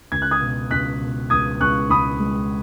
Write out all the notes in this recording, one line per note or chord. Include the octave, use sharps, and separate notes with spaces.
C#2 G#6
F#6
D#6 G#6
B2
C#2 F#6 B6
B2
C#2 D#6 G#6
C#2 C#6 F#6
C#2 B5 D#6
G#3